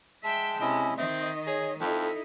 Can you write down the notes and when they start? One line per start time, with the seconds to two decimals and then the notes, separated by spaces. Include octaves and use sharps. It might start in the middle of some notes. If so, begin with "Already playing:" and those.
0.24 G#3 E5 G5 A5
0.61 C3 C#4 E4 D#5
0.97 D#3 C4 D#5 E5
1.47 G#4 C#5
1.81 F2 D#4 E4 A4